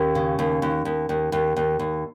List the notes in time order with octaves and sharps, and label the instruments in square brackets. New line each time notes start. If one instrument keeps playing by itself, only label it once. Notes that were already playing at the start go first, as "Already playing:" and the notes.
Already playing: [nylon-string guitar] D#2 C#4
C#3
D#2
D#2
D#2
D#2
D#2
D#2
D#2